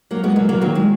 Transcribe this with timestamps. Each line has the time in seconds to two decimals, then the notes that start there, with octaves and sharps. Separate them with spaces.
0.11 F#3 A#3
0.24 G#3 B3
0.36 F#3 A#3
0.49 F#3 A#3
0.61 D#3 F#3
0.75 G#3